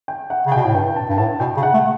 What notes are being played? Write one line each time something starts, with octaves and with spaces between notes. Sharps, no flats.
G5
F#5
C#3
B2 G5
A2
G2 G5
A5
G2
A2 A5
B2 G5
C#3
F#5
A3